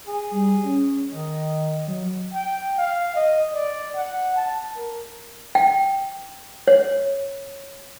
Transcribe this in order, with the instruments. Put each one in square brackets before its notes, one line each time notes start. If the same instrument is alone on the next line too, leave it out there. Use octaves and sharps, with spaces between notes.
[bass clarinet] G#4
[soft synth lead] G3
C#4
[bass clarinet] D#3 [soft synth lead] D#5
[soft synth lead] F#3
[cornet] G5
F5
D#5
D5
F#5
A5
A#4
[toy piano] G5
C#5